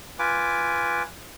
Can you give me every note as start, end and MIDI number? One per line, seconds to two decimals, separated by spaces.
0.19 1.03 65
0.19 1.03 71
0.19 1.03 80
0.19 1.03 86